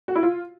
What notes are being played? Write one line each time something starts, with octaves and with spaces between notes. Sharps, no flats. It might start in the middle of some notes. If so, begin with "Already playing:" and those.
F#4
E4
F4